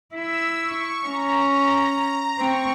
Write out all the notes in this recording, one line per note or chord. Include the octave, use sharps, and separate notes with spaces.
E4 E6
C#6
C#4 A#5
A#5
C4 C#6